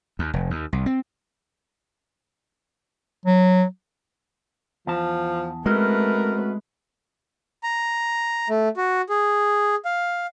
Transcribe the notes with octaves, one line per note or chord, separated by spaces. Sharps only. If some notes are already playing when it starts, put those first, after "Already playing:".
D#2
F1
D#2
C2
C4
F#3
E2 F3 A5
G#3 A3 C4 C#4 F#4 A#4 B4
A#5
A3
F#4
G#4
F5